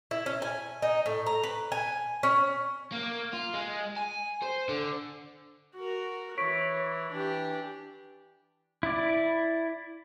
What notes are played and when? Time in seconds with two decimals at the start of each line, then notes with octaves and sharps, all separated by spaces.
0.11 E4
0.26 C#4
0.42 G#5
0.82 D#4
1.06 A2
1.26 A#5
1.43 B4
1.72 G#5
2.23 C#4
2.92 A#3
3.33 F4
3.53 G#3
3.97 G#5
4.42 C5
4.69 D3
5.75 F#4 A#4
6.38 E3 C#5 C#6 B6 D7
7.12 E3 D4 G4
8.83 E4 D5